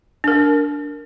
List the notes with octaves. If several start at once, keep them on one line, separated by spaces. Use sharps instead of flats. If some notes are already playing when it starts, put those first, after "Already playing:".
D4 A#4